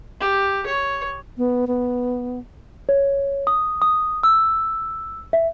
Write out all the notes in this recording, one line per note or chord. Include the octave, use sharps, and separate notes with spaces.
G4
C#5
B3
B3
C#5
D#6
D#6
E6
E5